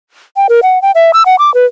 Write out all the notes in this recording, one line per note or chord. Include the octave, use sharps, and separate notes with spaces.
G5
A#4
F#5
G5
E5
E6
F#5
D6
B4